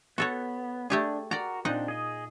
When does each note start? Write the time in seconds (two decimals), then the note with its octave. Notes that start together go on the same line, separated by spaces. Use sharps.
0.18 B3 F#4 A4 C#5
0.90 A3 D4 G4 G#4
1.31 F#4 A#4 D5 A#5
1.65 A#2 C4 D4 D#4 F#5
1.88 G#4 D#5